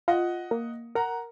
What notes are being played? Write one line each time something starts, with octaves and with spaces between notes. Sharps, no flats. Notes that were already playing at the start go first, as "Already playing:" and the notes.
F4 D#5 F#5
A#3
A#4 F#5 A#5